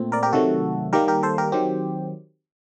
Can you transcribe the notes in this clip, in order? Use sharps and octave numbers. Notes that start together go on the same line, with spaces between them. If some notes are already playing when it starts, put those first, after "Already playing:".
Already playing: A#2 A3 C4
A#4 D5
G4 A#4
C3 D#3 F#3 A3 F#4 A4
D#3 G3 A#3 G4 A#4
G4 A#4
A4 C5
G4 A#4
D#3 F#3 C4 G4